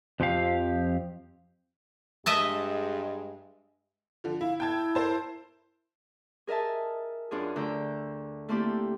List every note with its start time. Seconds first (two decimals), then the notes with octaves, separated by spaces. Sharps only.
0.20 F2 F3 C4 G4 F5
2.26 G2 G#3 D#5 E5 A5
4.24 D3 F3
4.41 E4 F5
4.60 E4 G5 A5 G#6
4.95 A#4 C5 A5
6.47 G#4 A#4 D#5 E5 A5
7.31 F#2 D4 F4 G#4
7.56 D2 D3 A#5 E6 G6
8.49 A3 A#3 C4 E4 G4 A4